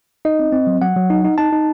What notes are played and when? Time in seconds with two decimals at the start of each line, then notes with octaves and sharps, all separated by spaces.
0.25 D#4 D#5
0.39 C4
0.52 C4
0.67 F#3
0.81 F#3 F#5
0.96 F#3
1.10 D#4
1.24 D#4
1.38 D#4 A5
1.52 D#4